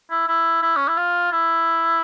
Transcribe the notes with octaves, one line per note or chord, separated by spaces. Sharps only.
E4
E4
E4
C#4
E4
F4
E4